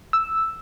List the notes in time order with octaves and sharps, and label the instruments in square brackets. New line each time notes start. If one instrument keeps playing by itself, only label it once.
[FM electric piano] E6